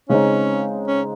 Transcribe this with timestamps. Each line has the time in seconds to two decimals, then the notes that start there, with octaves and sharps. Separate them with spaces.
0.09 C#3 G#3 C4 C#4 D#4
0.88 C#4